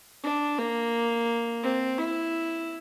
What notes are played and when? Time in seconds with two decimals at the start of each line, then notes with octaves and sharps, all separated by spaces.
0.24 D4
0.59 A#3
1.64 C4
1.98 E4